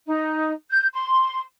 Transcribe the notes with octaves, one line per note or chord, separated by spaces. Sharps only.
D#4
G6
C6